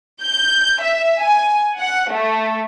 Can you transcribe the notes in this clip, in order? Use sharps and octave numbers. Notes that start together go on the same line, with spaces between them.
G6
E5
G#5
F#5
A3